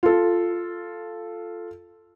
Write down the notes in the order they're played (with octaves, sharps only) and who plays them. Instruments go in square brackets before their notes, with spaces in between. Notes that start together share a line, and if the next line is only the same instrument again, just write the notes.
[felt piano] F4 A4